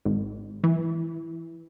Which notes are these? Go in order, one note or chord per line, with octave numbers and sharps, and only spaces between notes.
G#1
E3